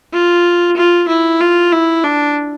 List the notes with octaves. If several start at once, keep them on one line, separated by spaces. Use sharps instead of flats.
F4
F4
E4
F4
E4
D4